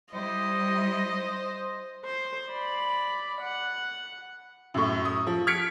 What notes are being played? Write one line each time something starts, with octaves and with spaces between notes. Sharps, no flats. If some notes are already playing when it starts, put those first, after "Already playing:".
G3 E4 C5 D#5
C5
D5 B5
F#5
F#2 A2
D#6
F3
F6 G#6 B6 C#7 D7